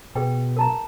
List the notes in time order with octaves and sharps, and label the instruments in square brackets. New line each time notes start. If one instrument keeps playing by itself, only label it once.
[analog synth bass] B2 [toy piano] G#4 B4 G5
[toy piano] A#4 A5 A#5